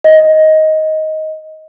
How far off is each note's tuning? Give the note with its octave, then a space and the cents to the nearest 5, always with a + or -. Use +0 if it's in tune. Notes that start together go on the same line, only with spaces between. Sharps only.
D#5 +10